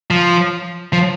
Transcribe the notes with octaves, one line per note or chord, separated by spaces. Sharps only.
F3
F3